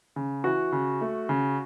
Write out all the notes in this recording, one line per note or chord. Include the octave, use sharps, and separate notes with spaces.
C#3
E3 F#4
C#3
A3
C#3